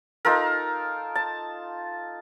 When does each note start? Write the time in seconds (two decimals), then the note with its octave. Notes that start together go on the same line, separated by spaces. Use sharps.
0.25 D#4 F4 A4 A#4
1.15 A5